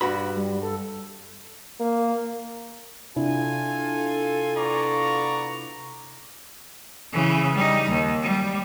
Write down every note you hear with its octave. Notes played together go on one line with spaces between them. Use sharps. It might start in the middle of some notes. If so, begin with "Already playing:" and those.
G2 F#4 B4 B5
G3
A4
A#3
C3 D4 E4 F4 A4 G#5
B3 D5 A#5 C#6
C#3 E3
G3 D#4
D#2
G3